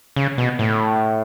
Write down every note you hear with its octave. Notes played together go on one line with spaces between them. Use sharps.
C#3
B2
A2